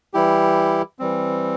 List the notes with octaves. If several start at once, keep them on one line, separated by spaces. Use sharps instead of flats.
E3 G3 E4 G4
E3 G3 C4